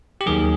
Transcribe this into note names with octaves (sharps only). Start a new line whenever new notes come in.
G4
D#2 D#3 F#3 G#4